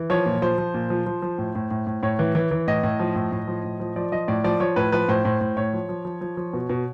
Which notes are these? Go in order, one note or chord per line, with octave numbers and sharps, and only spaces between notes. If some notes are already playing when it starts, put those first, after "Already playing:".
Already playing: E3
F3 C#5
A#2
F3 C5
F3
A#2
F3
F3
F3
A2
A2
A2
A2
A2 C#5
E3
E3
E3
A2 D#5
A2
F3
A2
A2
F3
A2
F3
F3 D5
F3 D#5
A2 D5
F3 D5
F3 C#5
A2 B4
F3 B4
A2 C5
A2 C5
A2
A2 C#5
F3
F3
F3
F3
F3
B2
B2